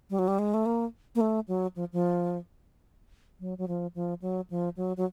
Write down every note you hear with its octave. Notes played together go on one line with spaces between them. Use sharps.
G3
F#3
G3
G#3
A3
A#3
A#3
A3
F#3
F3
F3
F#3
F#3
F3
F3
F#3
F3
F#3
F#3